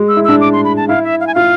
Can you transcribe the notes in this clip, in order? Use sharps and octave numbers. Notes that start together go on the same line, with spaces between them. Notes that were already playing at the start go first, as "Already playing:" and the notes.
Already playing: G#3
E6
E4
D4 E6
D6
C6
B5
A5
E4 F5
E5
F5
G#5
F4 F5